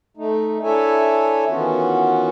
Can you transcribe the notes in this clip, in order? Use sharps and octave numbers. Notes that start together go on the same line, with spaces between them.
A3 D#4
D4 E4 A4 C#5 E5 G#5
D#3 E3 B3 C#4 F4 F#4